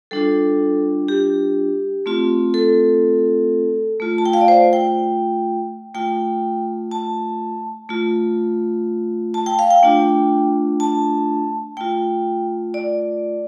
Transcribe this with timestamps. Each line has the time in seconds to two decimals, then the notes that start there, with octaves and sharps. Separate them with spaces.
0.11 G3 D4 F4 A4
1.08 G4
2.06 A3 C4 F4
2.54 A4
4.00 A3 F4
4.18 A5
4.25 G5
4.33 F5
4.41 D5
4.48 C5
4.73 G5
5.95 A3 F4 G5
6.91 A5
7.89 A3 F4
9.34 A5
9.46 G5
9.59 F5
9.70 G5
9.83 A3 D4 F4
10.80 A5
11.77 A3 F4 G5
12.74 D5